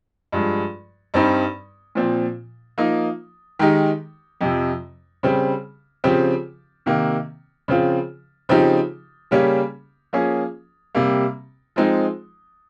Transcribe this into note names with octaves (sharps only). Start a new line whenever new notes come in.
G2 F3 G#3
G2 G3 C4 D#4
A#2 F3 C4
F3 A#3 D#4
D#3 G#3 D#4 G4
F2 C3 F3
C#3 G3 C4
C#3 F3 C4 G4
C3 D#3 A#3
C#3 F3 C4 F4
C#3 F3 C4 D#4 G4
C#3 G3 A#3 C#4 G4
F3 A#3 C#4 G#4
C3 G3 A#3
F3 G#3 C4 D#4